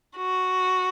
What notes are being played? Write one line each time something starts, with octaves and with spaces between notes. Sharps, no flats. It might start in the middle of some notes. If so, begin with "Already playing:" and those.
F#4